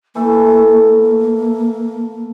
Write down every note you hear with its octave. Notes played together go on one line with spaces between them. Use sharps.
E3 A3 A#3 A4